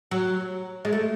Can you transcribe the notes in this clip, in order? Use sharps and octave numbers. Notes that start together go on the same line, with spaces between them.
F#3
G#3
A3